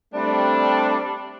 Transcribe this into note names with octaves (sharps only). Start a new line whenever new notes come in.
G3 A3 C4 D4